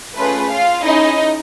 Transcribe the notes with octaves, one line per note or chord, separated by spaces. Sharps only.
A3 C#4 F4 G#4 B4
F4 F5
C#4 D#4 E4 G#4 D#5